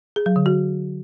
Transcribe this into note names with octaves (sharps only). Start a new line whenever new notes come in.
G#4
F#3
D3
F#4